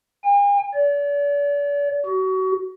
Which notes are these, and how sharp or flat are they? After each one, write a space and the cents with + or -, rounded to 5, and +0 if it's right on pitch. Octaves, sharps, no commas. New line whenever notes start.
G#5 -45
D5 -40
F#4 +30